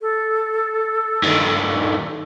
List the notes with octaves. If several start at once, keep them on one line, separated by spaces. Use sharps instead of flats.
A4
G2 D#3